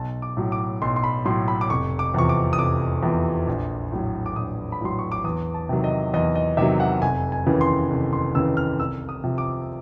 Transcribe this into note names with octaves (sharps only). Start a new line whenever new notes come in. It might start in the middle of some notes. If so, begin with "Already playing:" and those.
Already playing: B1 A5
D6
A2 F#3
D6
B1 C6
C6
B5
A2 F#3 C6
B5
D6
F1 C#6
D6
E2 C3 F3 C#6
D6
D#6
F1 D6
E2 C3 F3
A#1
A2 F#3
D6
A#1 D#6
B5
A2 F#3 C6
C#6
D6
E2 D#6
A5
C3 D#3 F#3
D#5
E2 D#5
D#5
C3 D#3 F#3 E5
F#5
F1 G#5
G#5
D#2 C#3 E3
C6
F1
C6
D#2 C#3 E3 E6
F6
C2 E6
D#6
C3 F3
D6